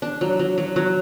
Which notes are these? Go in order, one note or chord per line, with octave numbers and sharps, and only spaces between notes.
D4
F#3
F#3
F#3
F#3